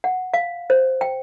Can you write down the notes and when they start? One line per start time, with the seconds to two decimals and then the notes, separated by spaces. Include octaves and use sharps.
0.04 F#5
0.34 F5
0.70 C5
1.01 G5